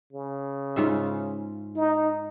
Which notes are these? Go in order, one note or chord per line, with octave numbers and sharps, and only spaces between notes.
C#3
G#2 F4 E5
D#4